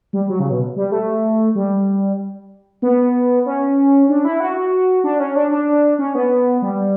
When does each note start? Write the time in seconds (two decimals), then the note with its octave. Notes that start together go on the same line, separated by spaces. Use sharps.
0.13 G3
0.29 F#3
0.40 C#3
0.50 B2
0.76 G3
0.92 A3
1.55 G3
2.82 B3
3.46 C#4
4.09 D4
4.25 E4
4.40 F#4
4.56 F#4
5.04 D4
5.20 C#4
5.36 D4
5.51 D4
5.99 C#4
6.15 B3
6.62 G3